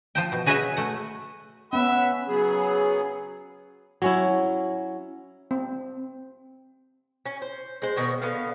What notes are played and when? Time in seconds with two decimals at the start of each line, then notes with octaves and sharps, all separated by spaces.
0.15 F3 C5 G5
0.32 B2
0.46 F#4 G#4 B4 C#5 D#5 E5
0.76 A3 F#5
1.73 B3 C#4 E5 F#5 B5
2.28 C#3 F#3 B3 G#4
4.02 F#3 C#4 E4
5.51 C4
7.26 C#4
7.42 C5
7.82 G#3 C5
7.96 B2 D#3 C#5
8.22 D3 B3 F5